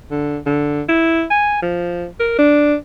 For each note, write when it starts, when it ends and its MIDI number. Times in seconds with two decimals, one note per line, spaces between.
0.11 0.38 50
0.46 0.82 50
0.89 1.24 64
1.30 1.62 80
1.62 2.06 53
2.20 2.35 70
2.39 2.75 62